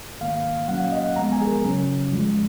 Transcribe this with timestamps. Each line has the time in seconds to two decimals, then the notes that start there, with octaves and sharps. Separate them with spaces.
0.21 G#2 D#3 A#3 F5
0.37 F5
0.68 A#2 F#3 A#3 C#4 F#5
0.80 F5
0.92 D#5
1.03 F#5
1.16 F#2 F3 G#3 B3 A#5
1.32 G#5
1.41 G#4
1.47 A#4
1.63 F#2 C#3 F#3 C#4
2.12 F2 F3 G#3